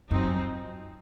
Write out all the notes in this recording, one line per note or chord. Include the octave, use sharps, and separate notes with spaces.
F#2 F3 C4 D#4